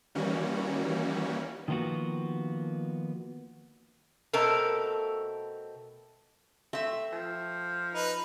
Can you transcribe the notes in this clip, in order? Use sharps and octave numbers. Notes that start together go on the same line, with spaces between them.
D#3 E3 G3 A#3 C#4 F#4
D#3 F3 A#3 B3 F#4
B2 A3 C4 A4 A#4
A3 C4 E5
F3
D#4 B4